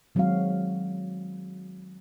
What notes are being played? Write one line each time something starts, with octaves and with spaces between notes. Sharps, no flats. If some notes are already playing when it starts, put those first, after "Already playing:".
D#3 F#3 G#3 C4 F#4 F5